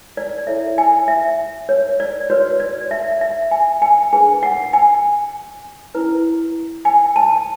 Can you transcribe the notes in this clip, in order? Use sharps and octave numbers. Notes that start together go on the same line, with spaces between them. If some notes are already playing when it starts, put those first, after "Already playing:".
D5
E4 A4 C#5 E5
G#5
E5
C#5
D5
F#4 B4 C#5
D5
E5
E5
G#5
G#5
D4 G#4 B4 G#5
F#5
G#5
C#4 E4 B4
G#5
A5